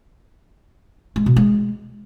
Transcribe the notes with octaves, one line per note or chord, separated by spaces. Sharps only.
G#3
B2
G#3